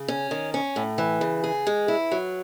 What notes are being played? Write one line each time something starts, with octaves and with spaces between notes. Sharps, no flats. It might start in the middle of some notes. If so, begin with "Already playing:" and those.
Already playing: C#3
C#4
D#3
C#4
A2
E3
C#3
G#4
G#3
E4
F#3